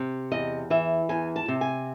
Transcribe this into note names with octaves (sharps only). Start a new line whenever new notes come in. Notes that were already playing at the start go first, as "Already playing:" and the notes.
Already playing: C3
E2 D#5
E3 E5
E2 G#5
A5
C3
G#5